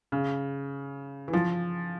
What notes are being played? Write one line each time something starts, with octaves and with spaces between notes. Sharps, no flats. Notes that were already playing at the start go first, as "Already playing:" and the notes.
C#3
E3
F3